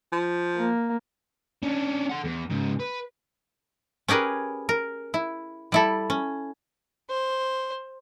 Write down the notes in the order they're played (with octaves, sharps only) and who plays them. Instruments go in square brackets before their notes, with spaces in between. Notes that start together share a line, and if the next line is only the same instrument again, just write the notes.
[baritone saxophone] F3
[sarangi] A#3
[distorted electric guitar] C#4 D4
A4 F#5
E2
G#2 C#3
B4
[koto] C#4 G4 G#4 A#4 B4
A#4
E4
G3 E4 A4
C#4
[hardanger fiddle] C5